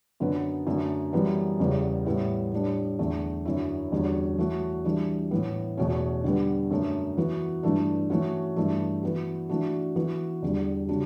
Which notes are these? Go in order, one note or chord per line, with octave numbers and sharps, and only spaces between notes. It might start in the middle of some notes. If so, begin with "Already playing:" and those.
F#2 D3 F#3 B3
F#2 D3 A3
F#2 E3 G3 B3
E2 C#3 E3 G3 B3
A2 G3 B3 E4
A2 G3 D4
E2 D3 A3
F#2 D3 F#3 C#4 E4
E2 D3 G3 C#4 F#4
E3 A3 C#4 F#4
E3 G3 D4
A2 E3 B3
E2 B2 A3 C#4
D3 G3 B3
F#2 D3 A3
E3 B3 F#4
G2 E3 A3 D4
E3 A3 C#4 F#4
G2 E3 A3
E3 B3 F#4
E3 A3 D4 F#4
E3 B3 F#4
E2 D3 G3
C#3 G3 D4 F#4